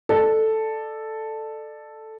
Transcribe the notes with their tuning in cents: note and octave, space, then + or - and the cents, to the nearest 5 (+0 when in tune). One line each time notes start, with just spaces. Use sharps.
A4 +0 D5 +30